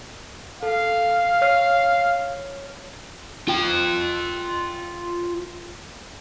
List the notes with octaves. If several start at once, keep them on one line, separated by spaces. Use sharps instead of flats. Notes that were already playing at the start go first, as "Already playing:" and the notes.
A4 F5
C#5 F6 C7
F4 G5